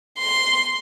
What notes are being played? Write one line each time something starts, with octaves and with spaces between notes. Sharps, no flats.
C6